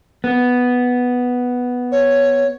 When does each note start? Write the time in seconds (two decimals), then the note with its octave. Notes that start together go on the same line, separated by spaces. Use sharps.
0.24 B3
1.92 C#5